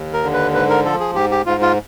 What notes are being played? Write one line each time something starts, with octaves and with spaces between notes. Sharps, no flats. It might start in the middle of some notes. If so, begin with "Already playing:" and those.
Already playing: D#2
A#4
D3
B4
G#2 B4
A#4
F3 A4
G#4
G#2 G4
G4
G#2 F4
F4